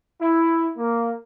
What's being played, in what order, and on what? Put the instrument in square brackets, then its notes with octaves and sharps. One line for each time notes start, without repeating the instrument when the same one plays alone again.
[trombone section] E4
A#3